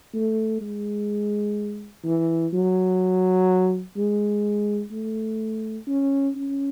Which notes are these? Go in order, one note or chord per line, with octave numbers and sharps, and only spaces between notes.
A3
G#3
E3
F#3
G#3
A3
C#4
C#4